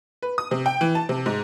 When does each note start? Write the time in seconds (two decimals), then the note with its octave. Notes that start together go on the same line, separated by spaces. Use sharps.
0.22 B4
0.38 D#6
0.51 C3
0.66 G5
0.81 E3
0.95 A5
1.09 C3
1.26 G#2